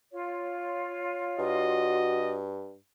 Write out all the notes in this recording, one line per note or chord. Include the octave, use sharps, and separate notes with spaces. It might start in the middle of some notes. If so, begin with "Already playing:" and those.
F4 C#5
G2 F#4 D#5